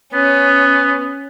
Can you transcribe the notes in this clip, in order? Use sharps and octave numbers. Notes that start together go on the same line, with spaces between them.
B3 C#4